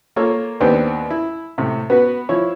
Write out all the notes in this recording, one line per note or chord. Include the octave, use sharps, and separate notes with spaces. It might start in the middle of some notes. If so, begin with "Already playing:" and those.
A#3 F4 A4 C#5
D#2 B3 C4 D4 G4
E4
A2 C3
B3 F#4 B4
F3 E4 C#5